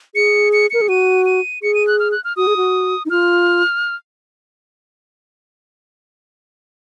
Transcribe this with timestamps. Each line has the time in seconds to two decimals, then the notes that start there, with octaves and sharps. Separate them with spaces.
0.15 G#4 C#7
0.53 C#7
0.70 A#4 C#7
0.81 G#4
0.88 F#4 D#7
1.26 D#7
1.62 G#4 C#7
1.75 D#7
1.87 F#6
2.00 F6
2.12 F#6
2.24 F6
2.37 F#4 D#6
2.47 G#4
2.56 F#4
3.05 D#4
3.10 F4 F6